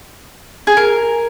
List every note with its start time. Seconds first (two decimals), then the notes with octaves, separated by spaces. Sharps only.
0.67 G#4
0.77 A#4